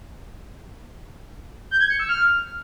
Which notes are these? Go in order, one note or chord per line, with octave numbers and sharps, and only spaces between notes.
G6
G#6
C#7
E6
F6